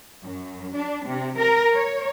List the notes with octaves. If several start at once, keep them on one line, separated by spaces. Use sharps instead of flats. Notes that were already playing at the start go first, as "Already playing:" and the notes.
F#2
D4
C3
A#4
C#5